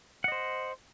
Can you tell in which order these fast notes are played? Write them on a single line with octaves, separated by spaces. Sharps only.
F#5 D#5 C5